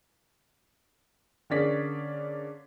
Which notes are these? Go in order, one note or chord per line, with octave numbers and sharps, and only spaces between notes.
D3 A#3 C#4 G#4 D5 B6